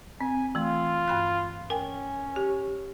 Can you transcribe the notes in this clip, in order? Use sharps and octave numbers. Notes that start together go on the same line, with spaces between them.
C4 G#5
E3 A3 F4
G2 B5 F#6
C#4 A#4 G5 G#5
G4